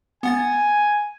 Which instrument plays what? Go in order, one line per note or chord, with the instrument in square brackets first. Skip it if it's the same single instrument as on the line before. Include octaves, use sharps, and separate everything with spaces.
[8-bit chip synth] B3 F#5 A6 [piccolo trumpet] G#5